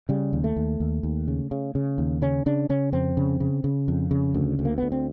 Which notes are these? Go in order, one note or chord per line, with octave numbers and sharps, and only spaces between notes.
C#3 G3
D#2
A3
D#2
D#2
D#2
C#3
C#3
C#3
D#2
C#3 C#4
C#3 D4
C#3 C#4
F2 C4
C#3
C#3
C#3
F2
C#3
D2
D2
A#3
D2 B3
C4